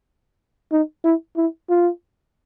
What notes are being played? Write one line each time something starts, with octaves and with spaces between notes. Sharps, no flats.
D#4
E4
E4
F4